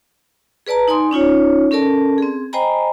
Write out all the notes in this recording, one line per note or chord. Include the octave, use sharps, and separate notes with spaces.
G#4 B4 D5 A5 A#5
D#4 D5 G#5 C6 D#6
C#4 D#4 F4 C#5
C#4 A4 A#4 D5 A5
C4 G#4
C5 D#5 G5 G#5 A#5 B5